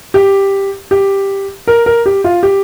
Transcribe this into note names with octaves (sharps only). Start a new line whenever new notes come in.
G4
G4
A#4
A#4
G4
F4
G4